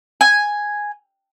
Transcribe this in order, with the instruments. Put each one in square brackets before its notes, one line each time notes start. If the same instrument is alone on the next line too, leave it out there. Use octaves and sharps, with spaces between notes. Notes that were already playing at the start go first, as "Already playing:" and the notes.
[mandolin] G#5